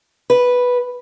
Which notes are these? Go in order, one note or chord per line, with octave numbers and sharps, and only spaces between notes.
B4